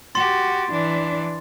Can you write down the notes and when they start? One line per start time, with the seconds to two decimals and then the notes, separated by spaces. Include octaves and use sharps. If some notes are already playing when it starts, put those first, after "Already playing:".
0.15 F#4 G4 C6 A6
0.71 E3 D4